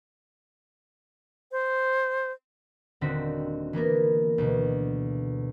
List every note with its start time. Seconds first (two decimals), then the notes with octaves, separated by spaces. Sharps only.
1.52 C5
3.01 D#1 D3 C4 D#4 F#4 B6
3.73 E3 A#3 B3 A#4
4.38 D2 B2